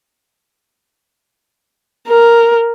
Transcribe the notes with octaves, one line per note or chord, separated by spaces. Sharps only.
A#4